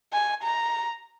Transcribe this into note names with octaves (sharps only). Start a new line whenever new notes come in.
G#5
A#5